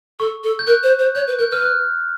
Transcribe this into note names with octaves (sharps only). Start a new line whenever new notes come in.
A4 C#6
A4
G6
A#4 F#6
C5
C5
C#5 G6
B4
A#4 G6
B4 F6
F#6